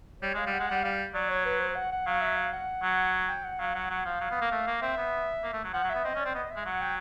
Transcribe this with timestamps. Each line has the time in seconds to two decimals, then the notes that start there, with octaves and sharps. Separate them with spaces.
0.22 G3 C#5
0.34 G#3 F5
0.47 G3
0.53 F#5
0.59 G#3
0.68 G3 F#5
0.83 G3 F5
1.14 F#3 D5
1.30 C#5
1.45 B4
1.60 C5
1.76 F#5
1.92 F#5
2.07 F#3 F5
2.21 E5
2.36 F5
2.53 F#5
2.83 F#3
3.28 G5
3.44 F#5
3.59 F#3 F5
3.75 F#3 F#5
3.90 F#3 F#5
4.05 F3 F5
4.21 F#3
4.31 B3
4.41 A#3
4.52 A3
4.67 A#3
4.82 C4 E5
4.97 B3
5.43 A#3
5.53 A3
5.64 F#3
5.73 F3 F#5
5.84 F#3
5.90 B3 E5
6.04 C4 D#5
6.15 C#4
6.20 D5
6.25 C4
6.35 B3 D#5
6.51 E5
6.56 G#3
6.66 F#3 F#5
6.82 G5